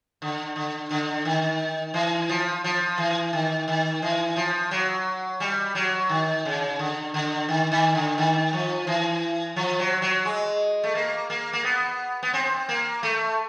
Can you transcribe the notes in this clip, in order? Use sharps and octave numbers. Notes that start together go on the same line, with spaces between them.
D3
D3
D3
D#3
E3
F3
F3
E3
D#3
D#3
E3
F3
F#3
G3
F#3
D#3
C#3
D3
D3
D#3
D#3
D3
D#3
F3
E3
F3
F#3
F#3
G#3
A3
A#3
A#3
A#3
B3
B3
C4
A#3
A3